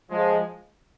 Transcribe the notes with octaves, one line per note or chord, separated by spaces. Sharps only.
F3 G#3